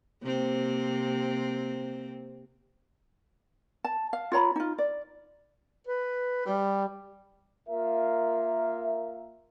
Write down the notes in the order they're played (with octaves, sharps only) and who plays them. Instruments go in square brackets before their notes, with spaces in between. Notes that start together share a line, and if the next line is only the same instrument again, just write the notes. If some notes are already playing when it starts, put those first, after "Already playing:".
[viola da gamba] C3 A#3 C4
[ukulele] A5
F5
F4 C#5 A#5 B5
D#4 F4
D5
[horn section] B4
G3
[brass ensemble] A#3 F4 A#4 E5